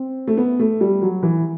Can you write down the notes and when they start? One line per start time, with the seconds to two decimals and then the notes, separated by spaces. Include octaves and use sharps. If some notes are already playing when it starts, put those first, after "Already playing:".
Already playing: C4
0.28 A3
0.37 B3
0.59 A3
0.81 G3
1.02 F#3
1.23 E3